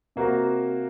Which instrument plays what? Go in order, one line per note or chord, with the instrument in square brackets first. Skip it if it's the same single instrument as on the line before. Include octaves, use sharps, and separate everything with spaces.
[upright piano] C3 A#3 F#4